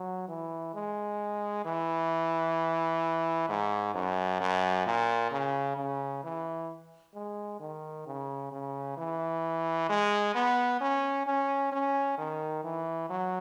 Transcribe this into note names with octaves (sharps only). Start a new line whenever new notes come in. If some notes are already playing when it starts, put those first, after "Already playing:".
Already playing: F#3
E3
G#3
E3
G#2
F#2
F#2
A#2
C#3
C#3
E3
G#3
D#3
C#3
C#3
E3
G#3
B3
C#4
C#4
C#4
D#3
E3
F#3